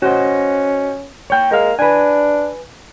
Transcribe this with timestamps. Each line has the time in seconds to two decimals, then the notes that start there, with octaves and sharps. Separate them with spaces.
0.02 C#4 F#4 C5 D#5
1.30 C#5 G5
1.51 G#3 A#4 F5
1.79 D4 B4 G#5